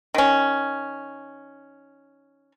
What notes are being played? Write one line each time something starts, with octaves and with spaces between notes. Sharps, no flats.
D#3 C#4